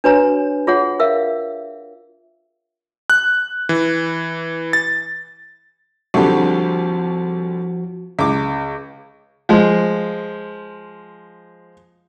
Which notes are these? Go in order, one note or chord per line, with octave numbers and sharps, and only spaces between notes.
D4 F#4 B4 C#5 G#5 A#5
F4 G#4 C#5 F#5
A#4 E5 F5
F#6
E3
A6
C2 D3 F3 G3 F#4
C#2 D6
F3 G#3